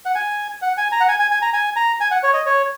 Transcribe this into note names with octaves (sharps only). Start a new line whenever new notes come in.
F#5
G#5
F#5
G#5
A#5
F#5
G#5
G#5
G#5
A#5
G#5
A#5
G#5
F#5
C#5
D#5
C#5